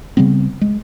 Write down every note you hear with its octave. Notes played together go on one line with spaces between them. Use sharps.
C#3 G3 B3 C4
G#3